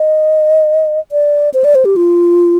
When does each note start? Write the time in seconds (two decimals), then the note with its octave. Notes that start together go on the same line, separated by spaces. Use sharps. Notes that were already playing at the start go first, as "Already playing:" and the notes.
Already playing: D#5
1.12 D5
1.54 C5
1.64 D5
1.75 C5
1.85 G4
1.96 F4